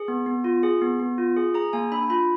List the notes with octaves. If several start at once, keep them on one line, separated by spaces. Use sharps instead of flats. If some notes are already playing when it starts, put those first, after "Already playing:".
Already playing: G#4
B3
B3
F4
G#4
B3
B3
F4
G#4
G#4 A#5
A#3 G#5
D4 B5
F4 B5